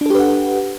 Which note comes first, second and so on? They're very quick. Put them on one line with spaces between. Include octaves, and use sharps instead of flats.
D4 A4 G4 B4 F#5